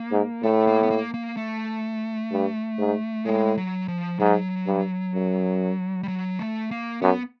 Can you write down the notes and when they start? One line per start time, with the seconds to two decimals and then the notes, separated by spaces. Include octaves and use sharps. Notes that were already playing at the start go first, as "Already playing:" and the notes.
Already playing: A#3
0.12 G#2
0.43 A2 A3
0.67 A#3
0.83 B3
0.90 A#3
1.14 A#3
1.37 A3
2.32 G2
2.79 G#2
3.25 A2 G#3
3.57 F#3
3.88 F3
4.19 G#2 F#3
4.67 G2
5.14 F#2
6.03 G3
6.08 F#3
6.39 A3
6.71 A#3
7.02 F#2 B3